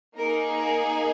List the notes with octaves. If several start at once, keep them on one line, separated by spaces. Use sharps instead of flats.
A#3 D#4 G#4 A#4
A#4